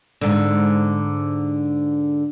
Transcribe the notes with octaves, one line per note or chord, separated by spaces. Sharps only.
G#2 D3